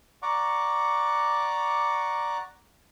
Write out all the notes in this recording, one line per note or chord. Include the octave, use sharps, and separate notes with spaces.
D5 F#5 A#5 C#6 D6